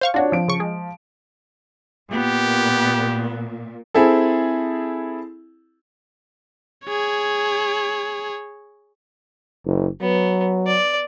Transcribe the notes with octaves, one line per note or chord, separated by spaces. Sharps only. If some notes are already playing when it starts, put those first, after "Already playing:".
C5 F5 C#6
D4 F4 F#4 C#5
F3 D7
C#3 C#6
G#3
A#2 B3 G4
C4 E4 G#4 A4
G#4 C#5
F#1
F#3 B3
D5